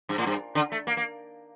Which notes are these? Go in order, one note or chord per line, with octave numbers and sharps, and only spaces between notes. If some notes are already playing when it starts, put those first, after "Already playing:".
G2
A2
G2
D3
A3
A#3
A#3